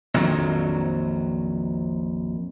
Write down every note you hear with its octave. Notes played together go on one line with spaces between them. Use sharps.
A#1 F2 D#3 F#3